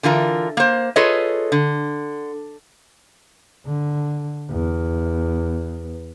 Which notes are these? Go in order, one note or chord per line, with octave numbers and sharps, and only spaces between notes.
D3 E3 F4 A#4
A#3 C5
F4 G#4 A4 B4 C#5 D#5
D3
D3
E2